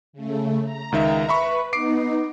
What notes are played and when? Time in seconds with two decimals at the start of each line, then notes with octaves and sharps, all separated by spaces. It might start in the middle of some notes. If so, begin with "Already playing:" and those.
0.13 C#3 A3
0.63 A#5
0.92 C#2 D#3 E5
1.29 B4 E5 B5 C#6
1.73 B3 D#4 D6 C7 D7